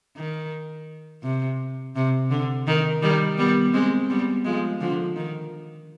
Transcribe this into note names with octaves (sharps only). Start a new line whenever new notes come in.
D#3
C3
C3
D3
D#3
D#3 G3
G3 B3
G#3 C4
G3 B3
F3 G#3
D3 F3
D#3